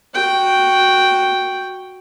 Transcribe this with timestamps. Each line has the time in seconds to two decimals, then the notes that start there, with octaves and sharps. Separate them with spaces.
0.14 F#4 G5